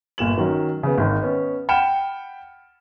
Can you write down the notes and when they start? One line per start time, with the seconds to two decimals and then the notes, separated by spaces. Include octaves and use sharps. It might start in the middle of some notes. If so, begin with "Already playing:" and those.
0.18 G1 A#2 E7 F#7
0.38 D#3 F#3 C#4
0.83 C#3 B3
0.98 G#1 D#3
1.22 B3 C#4
1.69 F#5 G5 B5 F6 C#7 E7